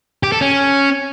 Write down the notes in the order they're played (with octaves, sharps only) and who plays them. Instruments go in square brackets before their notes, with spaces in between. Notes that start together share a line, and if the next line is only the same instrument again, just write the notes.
[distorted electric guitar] G4
A4
C#4